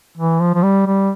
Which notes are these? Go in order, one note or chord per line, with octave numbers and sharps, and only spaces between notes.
E3
F3
F3
G3
G3